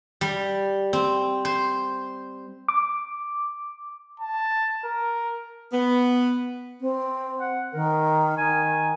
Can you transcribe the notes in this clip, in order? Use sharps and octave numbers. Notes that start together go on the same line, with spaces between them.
G3
C4
C5
D6
A5
A#4
B3
C4
F#5
D#3 A#4
D#3 G#5